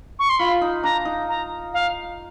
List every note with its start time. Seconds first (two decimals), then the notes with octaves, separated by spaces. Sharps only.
0.19 C#6
0.29 C6
0.39 F4 B5
0.61 D#4
0.83 D4 A#5
1.05 D#4
1.29 A#5
1.73 F5